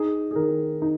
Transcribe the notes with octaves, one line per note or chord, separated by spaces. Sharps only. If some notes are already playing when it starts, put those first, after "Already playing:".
Already playing: D#4 G#4
G#4
D#3 A#4
D#4